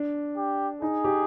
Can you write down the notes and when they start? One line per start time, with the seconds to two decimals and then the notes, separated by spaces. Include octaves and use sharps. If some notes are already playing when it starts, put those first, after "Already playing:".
Already playing: D4
0.37 G4
0.82 D#4 G#4
1.04 G4